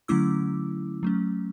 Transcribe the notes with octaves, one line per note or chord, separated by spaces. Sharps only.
D3 F#3 A3 C#4 E4 D6 E6
F#3 A3 C#4